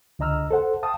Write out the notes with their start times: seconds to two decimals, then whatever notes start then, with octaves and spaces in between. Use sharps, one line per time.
0.19 C#2 D3 D#5 A#5 E6 F6
0.51 A4 C5 F#5
0.83 F5 G5 A5 D#6